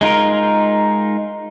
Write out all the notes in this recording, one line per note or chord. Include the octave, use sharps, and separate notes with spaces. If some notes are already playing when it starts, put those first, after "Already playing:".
G#3 D#4 F4 A#4